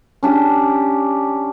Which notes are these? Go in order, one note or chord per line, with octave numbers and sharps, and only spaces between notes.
C#4 D4 G4